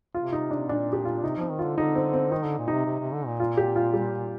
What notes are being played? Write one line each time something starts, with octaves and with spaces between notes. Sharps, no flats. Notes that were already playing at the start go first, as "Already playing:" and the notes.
C3 F4
D#4
D4
A#2 D4
G4
F4
C3 D#4
F3 C4
D#3
F4
D3
D3 D#4
C4
C4
D#3 D#4
D3
A#2
C3 D#4
C3
C3
D3
A#2
F4
G4
F4
G3